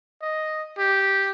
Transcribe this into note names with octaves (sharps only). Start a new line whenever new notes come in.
D#5
G4